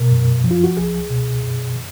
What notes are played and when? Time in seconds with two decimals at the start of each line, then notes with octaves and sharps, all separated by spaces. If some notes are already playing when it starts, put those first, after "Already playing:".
Already playing: B2 A#4
0.11 F#2
0.44 F3
0.51 F4
0.64 F#4
0.77 C#2 G#4
1.10 B2
1.42 F#2
1.75 D#3